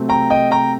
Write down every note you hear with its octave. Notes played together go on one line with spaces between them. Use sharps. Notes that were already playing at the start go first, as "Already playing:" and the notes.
Already playing: C3 F#3 A3 C4
G5 A#5
D#5 G5
G5 A#5